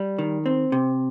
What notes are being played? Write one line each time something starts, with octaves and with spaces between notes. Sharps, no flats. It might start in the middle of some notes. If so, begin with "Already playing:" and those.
Already playing: G3
D#3
C4
C3